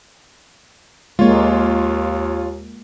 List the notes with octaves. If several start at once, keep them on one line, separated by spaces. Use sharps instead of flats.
D#2 G#3 A#3 F4 C#5